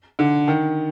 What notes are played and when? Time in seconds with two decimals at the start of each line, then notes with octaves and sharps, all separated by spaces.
0.19 D3
0.48 D#3